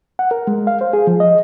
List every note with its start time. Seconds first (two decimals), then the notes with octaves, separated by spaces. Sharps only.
0.19 F#5
0.31 A#4
0.47 G#3
0.67 F5
0.81 C5
0.93 G#4
1.07 F3
1.20 D#5